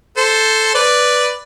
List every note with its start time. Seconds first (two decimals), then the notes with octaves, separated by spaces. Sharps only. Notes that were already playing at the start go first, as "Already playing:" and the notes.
0.17 A4 C5
0.75 B4 D5